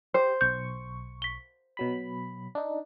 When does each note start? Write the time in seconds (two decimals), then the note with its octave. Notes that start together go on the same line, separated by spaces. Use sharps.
0.14 G4 C5
0.41 B1 C#6 G6
1.22 B6 G7
1.77 B2 F#3 B5
2.55 D4 D#4